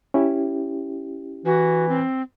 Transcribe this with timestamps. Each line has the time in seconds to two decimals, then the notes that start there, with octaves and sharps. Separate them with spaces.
0.14 C#4 E4 G4
1.46 E3 F#4
1.89 C4